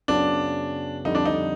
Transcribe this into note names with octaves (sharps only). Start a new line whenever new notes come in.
F#2 C#3 F#3 B3 D4
F2 D3 G3 D#4
D4
D#4